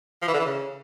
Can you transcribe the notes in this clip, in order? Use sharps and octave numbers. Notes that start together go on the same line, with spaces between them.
F3
E3
D3
E3
C#3